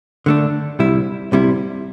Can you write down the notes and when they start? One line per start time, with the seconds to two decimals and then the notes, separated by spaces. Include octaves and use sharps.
0.26 D3 A3 D4
0.79 C2 C3 G3 E4
1.32 C2 C3 G3 E4